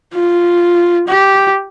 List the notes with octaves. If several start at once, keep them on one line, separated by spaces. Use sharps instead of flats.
F4
G4